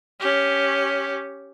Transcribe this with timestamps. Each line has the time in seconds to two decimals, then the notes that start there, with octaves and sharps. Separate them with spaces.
0.20 C#4 G4